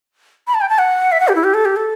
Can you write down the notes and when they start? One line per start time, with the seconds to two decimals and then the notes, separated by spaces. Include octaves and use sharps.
0.47 B5
0.54 A5
0.61 G5
0.69 A5
0.79 F#5
1.12 E5
1.20 F#5
1.28 G4
1.35 E4
1.44 G4
1.54 A4
1.65 G4
1.76 A4